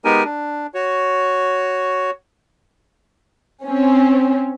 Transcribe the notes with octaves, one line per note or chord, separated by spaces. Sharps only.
G#3 B3 D#4 G4 A#4 G#5
D4
F#4 C#5
C4 C#4